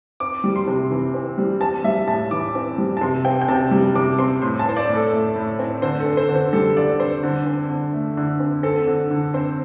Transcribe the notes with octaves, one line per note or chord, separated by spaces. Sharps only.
C4 D6
G3
C6
C3
E3
C4
G3
C4 A5
G3 E5
A2 A5
E3 D6
C4
G3
A5
C3 C6
C4 G5
G5
C3 A5
G3
C3 D6
C4 C6
A2 C6
A5
C4 C5
D5
A2
A4
A3
A2
C4
D3 C5
A4
C4
C5
D3
C5
G3 A4
D3 D5
C4 C5
D3
C4
D3
A3
D3
C4
C4 A4
D3
D3
C4 C5